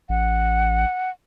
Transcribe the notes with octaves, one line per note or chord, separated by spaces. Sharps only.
A1 F#5